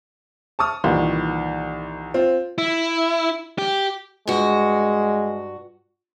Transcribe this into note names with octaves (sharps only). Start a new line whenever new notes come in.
A5 C#6 D#6 F6
C2 A#2 D#3 E3
C4 F4
E4
G4
G2 G#3 F#4